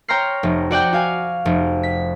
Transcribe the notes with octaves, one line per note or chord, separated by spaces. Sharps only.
C#5 G5 A#5 C6 F6 C7
F1
F#4 D5 F#5 G5
F#4 F5 G#5
F1
B6